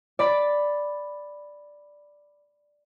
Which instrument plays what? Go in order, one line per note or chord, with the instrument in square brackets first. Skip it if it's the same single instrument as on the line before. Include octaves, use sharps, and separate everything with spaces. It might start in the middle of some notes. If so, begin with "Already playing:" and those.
[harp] D5 B5 A6